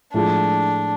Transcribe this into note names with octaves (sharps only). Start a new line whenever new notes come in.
A2 F3 G#3 D4